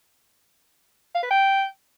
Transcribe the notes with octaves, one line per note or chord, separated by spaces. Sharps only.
F5
B4
G5